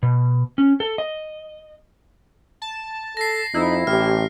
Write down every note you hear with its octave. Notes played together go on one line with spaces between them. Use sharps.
B2
C#4
A4
D#5
A5
A4 A#6 C7
F2 D#4 E4
A1 G4 F6